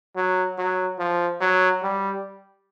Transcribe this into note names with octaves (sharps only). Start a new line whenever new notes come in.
F#3
F#3
F3
F#3
G3